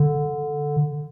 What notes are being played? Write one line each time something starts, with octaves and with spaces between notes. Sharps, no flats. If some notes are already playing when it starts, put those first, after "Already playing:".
Already playing: D3